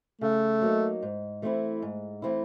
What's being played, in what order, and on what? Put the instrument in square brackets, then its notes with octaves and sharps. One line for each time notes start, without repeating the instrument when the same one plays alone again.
[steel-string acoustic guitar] C#3 [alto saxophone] A3
[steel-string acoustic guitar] F#3 A#3 D#4
G#2
E3 A3 C4 E4
G#2
E3 A3 C4 E4